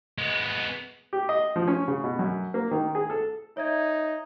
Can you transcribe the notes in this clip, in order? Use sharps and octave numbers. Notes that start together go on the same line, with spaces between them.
G#3 B3
G4
D#5
F3
C#4
C#3
B2
F#2
A#3
D#3
G#4
A4
D#4 C#5 E5 G#6